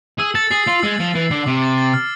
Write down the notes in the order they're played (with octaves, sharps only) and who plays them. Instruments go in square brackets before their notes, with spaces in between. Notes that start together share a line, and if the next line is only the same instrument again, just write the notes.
[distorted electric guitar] G#4 [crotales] E6
[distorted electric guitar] A4 [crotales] A6
[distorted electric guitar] G#4 [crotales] C7
[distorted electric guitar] F4 [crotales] C7
[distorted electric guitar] G#3 [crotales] E6
[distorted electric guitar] F3 [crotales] A6
[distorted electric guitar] E3 [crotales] A6
[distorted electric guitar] D3 [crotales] C7
[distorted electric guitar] C3 [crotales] D6
[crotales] A6
A6
F6